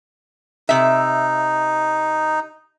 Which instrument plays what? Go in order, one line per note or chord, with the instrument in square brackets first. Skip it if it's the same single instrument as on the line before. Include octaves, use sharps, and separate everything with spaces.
[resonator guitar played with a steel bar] C3 E5 [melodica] D#4